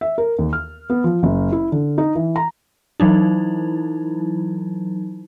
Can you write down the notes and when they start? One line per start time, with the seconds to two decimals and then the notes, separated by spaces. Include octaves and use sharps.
0.01 E5
0.18 A#4
0.39 D#2
0.53 F6
0.90 B3
1.04 F3
1.23 F#1
1.52 E4
1.72 D3
1.98 D#4
2.15 E3
2.36 A#5
3.00 E3 F#3 D#4 E4